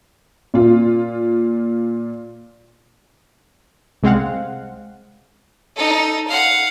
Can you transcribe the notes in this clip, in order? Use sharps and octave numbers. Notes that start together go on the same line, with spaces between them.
A#2 F4
C2 G#3 C4 F5 F#5
D#4 A4
F5 F#5